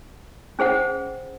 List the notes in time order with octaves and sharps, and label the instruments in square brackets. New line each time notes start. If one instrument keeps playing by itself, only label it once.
[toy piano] C#4 G#4 C5 F#5